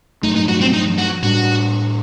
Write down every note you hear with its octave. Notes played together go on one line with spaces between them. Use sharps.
G2 F#3 A3 D#4
D#4
F#4
C4
D#4
F#4
A2 G3 D4 F#4